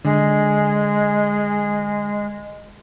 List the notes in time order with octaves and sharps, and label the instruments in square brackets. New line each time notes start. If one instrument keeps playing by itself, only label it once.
[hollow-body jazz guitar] D3 [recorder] G#3